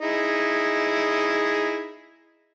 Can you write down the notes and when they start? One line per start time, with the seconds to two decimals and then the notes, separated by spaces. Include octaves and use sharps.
0.02 D#4 E4 G#4